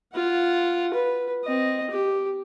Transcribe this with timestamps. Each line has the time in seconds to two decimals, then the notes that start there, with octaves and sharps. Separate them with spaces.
0.14 F4 F#5
0.94 B4
1.44 C4 D#5
1.90 G4